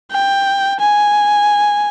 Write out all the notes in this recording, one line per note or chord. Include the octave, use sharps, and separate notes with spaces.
G5
G#5